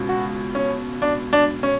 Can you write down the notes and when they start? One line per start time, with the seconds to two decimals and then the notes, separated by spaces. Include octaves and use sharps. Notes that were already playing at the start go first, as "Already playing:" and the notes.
Already playing: C#2 B2
0.09 F#4
0.55 C#4
1.02 D4
1.33 D4
1.63 C#4